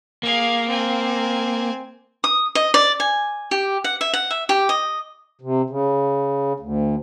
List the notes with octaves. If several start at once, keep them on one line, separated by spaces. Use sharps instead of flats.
A#3 G#4 F5
C4 G#5
D#6
D#5
D5
G#5
G4
F#5
E5
F#5
E5
G4
D#5
C3
C#3
D2